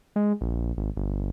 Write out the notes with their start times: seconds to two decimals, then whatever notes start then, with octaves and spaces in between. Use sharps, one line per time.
0.16 G#3
0.41 A#1
0.77 G#1
0.97 G1